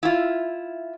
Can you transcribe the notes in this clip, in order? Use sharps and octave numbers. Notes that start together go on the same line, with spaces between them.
E4 F4